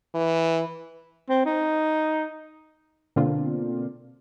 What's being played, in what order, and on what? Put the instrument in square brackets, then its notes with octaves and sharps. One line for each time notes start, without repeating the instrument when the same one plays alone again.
[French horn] E3
[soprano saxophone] C4
D#4
[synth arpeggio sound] B2 D3 A#3 C4 D4 F4